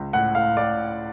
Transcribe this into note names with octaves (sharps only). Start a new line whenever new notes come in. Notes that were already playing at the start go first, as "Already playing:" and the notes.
Already playing: C#2
A2 F#5
A2 F5
A2 D5